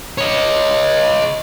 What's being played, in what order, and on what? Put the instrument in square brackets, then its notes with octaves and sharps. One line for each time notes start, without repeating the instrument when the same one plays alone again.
[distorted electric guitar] C#5 D#5